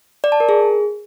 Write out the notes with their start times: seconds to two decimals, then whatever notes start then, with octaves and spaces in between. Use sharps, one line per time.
0.24 D5
0.32 A5
0.40 A#4
0.49 G#4